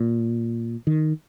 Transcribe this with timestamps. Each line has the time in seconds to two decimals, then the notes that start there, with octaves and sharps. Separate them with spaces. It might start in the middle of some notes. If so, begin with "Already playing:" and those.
Already playing: A#2
0.87 D#3